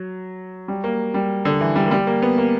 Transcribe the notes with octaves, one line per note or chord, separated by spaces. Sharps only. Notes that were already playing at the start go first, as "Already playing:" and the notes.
Already playing: F#3
G3
A#3
G3
D3
E3
G3
A#3
G3
A#3
B3
A#3